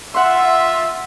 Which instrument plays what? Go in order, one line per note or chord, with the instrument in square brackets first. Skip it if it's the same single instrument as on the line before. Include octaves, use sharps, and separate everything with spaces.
[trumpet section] F4 E5 [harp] F#5 C6